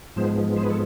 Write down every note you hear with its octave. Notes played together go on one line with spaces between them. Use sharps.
G#2 F3 G#3 B3 C5
C5
B4
A4